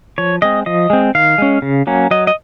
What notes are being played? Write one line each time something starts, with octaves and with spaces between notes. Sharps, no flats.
F3 C#5
G#3 C4 D#5
F3 D#5
G#3 C4
D#3 F5
G#3 C#4
C#3
F#3 A#3 C#4
F#3 D#5
D#5